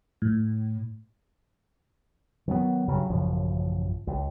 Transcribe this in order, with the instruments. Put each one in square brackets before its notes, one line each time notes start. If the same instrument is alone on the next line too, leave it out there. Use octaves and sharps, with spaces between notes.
[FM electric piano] A2
[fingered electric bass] D#3 F#3 A#3 B3
G2 C#3 F#3
A1 F#2 C#3 F3
C#2